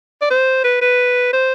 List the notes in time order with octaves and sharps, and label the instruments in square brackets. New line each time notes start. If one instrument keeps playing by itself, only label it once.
[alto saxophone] D5
C5
B4
B4
C5